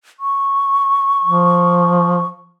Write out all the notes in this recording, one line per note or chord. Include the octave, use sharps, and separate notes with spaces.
C#6
F3